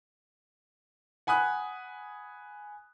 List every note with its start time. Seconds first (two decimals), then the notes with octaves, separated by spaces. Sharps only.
1.27 F#5 G#5 B5 D#6 F#6